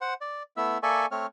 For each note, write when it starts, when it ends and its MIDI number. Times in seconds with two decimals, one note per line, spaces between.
0.01 0.14 72
0.01 0.14 78
0.21 0.43 74
0.57 0.78 57
0.57 0.78 59
0.57 0.78 64
0.57 0.78 76
0.57 0.78 88
0.83 1.06 58
0.83 1.06 69
0.83 1.06 74
0.83 1.06 76
0.83 1.06 80
0.83 1.06 85
1.11 1.26 57
1.11 1.26 60
1.11 1.26 73
1.11 1.26 89